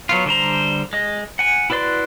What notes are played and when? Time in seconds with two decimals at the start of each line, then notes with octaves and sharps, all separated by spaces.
0.09 F#3 B3 F4
0.26 D3 G3 C5 A#5
0.93 G#3 D#5
1.39 F#5 G#5
1.70 E4 F#4 B4 D5 C6